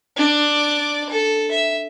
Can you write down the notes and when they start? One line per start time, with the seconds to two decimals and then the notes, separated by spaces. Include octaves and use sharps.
0.16 D4 D5
1.10 A4
1.51 E5